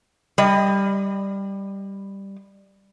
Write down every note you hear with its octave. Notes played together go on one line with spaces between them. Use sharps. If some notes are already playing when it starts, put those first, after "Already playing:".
G3 D#5